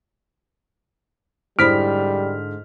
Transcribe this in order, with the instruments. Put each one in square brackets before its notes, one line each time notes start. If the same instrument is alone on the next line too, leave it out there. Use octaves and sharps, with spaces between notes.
[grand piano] G#2 D3 [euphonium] G3 [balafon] E4 C5 B5 [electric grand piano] F6 B6